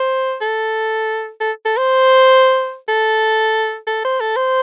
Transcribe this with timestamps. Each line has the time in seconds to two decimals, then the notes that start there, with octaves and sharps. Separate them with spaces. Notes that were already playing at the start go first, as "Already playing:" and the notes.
Already playing: C5
0.41 A4
1.41 A4
1.65 A4
1.77 C5
2.88 A4
3.87 A4
4.04 C5
4.21 A4
4.37 C5